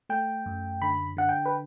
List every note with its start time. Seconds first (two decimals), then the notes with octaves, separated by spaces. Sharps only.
0.09 A3 G5
0.46 F#2
0.82 D3 B5
1.17 D3 F#5
1.29 G5
1.46 B4